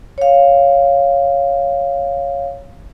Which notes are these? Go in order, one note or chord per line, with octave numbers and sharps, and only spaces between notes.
C#5 F5